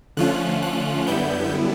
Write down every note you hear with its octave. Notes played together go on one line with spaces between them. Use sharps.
D3 F3 A3 C#4 F4 F#6
F#6
F#2 D3 G3 B3 E4 G6